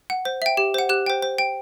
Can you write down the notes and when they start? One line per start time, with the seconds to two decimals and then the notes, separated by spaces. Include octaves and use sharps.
0.10 F#5
0.25 C5
0.42 E5 G5
0.57 G4
0.74 C5 F#5
0.89 G4 F#6
1.06 C5 G5
1.22 C5
1.39 G5